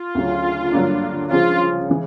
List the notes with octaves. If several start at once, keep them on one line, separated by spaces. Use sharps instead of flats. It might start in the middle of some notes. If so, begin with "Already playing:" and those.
Already playing: F4
D2 C#3 F#3
G2 D3 F#3 A#3 D4
C#3 F3 G#3 C#4 F4
C#3 E3 G#3